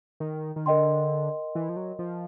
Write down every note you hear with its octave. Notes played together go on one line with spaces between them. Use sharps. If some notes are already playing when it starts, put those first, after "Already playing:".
D#3
D#3
D3 A#4 D#5 G5 C6
E3
F3
F#3
F3